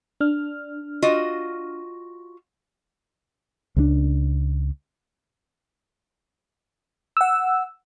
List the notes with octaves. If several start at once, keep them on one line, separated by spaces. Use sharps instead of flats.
D4 F6
F4 F#4 D#5
C#2 F#3 D4
F#5 E6